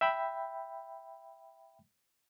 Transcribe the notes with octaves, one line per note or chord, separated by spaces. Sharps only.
E5 G5 B5